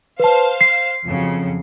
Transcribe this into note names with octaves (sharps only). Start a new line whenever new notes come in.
B4 C5 F5 A5
C7
F2 C#3 F#3